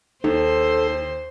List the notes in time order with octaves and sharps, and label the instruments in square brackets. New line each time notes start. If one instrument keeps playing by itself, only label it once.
[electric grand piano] D#2 [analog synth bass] D#4 [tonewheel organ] A4 [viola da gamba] C5